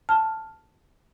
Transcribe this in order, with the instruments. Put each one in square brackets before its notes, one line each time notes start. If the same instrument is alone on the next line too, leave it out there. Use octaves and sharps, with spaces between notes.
[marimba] A5 F6